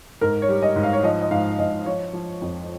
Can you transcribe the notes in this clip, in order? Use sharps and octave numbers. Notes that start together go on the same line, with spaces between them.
G#2 A#4
C#5
G3
D#5
G#2
F5
C#5
F3 D#5
D#5
G#2 F5
G#2 D#5
F3 C#5
F3
F2